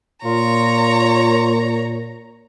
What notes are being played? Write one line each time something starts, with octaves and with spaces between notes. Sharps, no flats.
A#2 F4 C#5 A#5